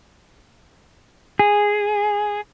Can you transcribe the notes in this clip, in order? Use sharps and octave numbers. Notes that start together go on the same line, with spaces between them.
G#4